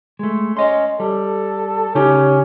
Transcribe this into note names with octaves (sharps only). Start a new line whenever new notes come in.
G#3 A3
C#4 C#5 D#5 C6
G3 A4
C#3 C#4 D#4 G4